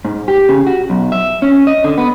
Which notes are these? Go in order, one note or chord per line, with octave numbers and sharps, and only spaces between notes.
G#2
G4
C#3
F#4
B1
E5
C#4
D#5
D3
B3